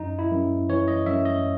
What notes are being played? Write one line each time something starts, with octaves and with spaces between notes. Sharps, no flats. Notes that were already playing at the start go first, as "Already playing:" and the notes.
Already playing: F#2 D#4
E4
F#2
E3 C#5
D#5
F#2 E5
D#5